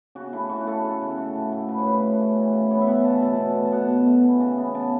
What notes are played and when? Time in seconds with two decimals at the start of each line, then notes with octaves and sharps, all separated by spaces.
0.15 C#3 F#4
0.33 A3 E4
0.49 C#3 F#4
0.67 A3 A4
0.84 C#3
1.01 C#3
1.18 A3
1.35 A2
1.52 A3
1.69 A2 B4
1.78 C#5
1.86 A2 B4
2.03 A3
2.20 C#3
2.37 E3
2.53 C#3
2.70 B3 C#5
2.81 E5
2.87 C#3 F#5
3.04 E3 A5
3.22 B2 A5
3.39 B2
3.55 A3
3.65 A5
3.72 B2 F#5
3.89 B2
4.06 A3
4.23 E3
4.40 C#3
4.58 B3
4.74 C#3 A5